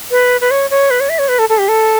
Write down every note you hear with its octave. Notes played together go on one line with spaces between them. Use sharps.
B4
B4
C#5
C#5
B4
C#5
E5
C#5
B4
A4
A4
G4
A4